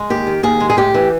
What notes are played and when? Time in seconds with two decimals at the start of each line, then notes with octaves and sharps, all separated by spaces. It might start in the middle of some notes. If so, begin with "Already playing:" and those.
Already playing: G#3
0.10 D#2 G4
0.27 D#3
0.43 D#2 G#4
0.60 G#3
0.70 G#4
0.77 A2 G4
0.94 E3